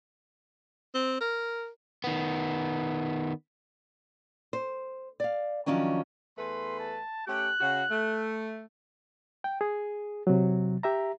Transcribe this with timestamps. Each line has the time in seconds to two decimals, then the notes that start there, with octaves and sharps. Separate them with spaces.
0.95 C4
1.21 A#4
2.04 D#3 B3
4.53 C5
5.20 D5 F5
5.66 D#3 F3 F#3 C#4 D4
6.38 E2 A3 B4 C6
6.79 A5
7.27 A3 C#4 G4 F#6
7.61 C#3 F#4
7.90 A3
9.44 G5
9.61 G#4
10.27 C3 F#3
10.83 G4 E5 A#5